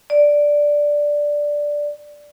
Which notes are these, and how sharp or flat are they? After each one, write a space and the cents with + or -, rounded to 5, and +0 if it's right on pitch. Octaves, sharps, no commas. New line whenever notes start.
D5 +0